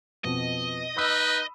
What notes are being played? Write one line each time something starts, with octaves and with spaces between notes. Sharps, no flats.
F2 B2 D#5
D#4 B4 B5 D#6 E6